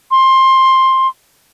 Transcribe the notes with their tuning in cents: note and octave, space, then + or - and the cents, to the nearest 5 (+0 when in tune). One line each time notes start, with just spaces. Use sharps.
C6 +15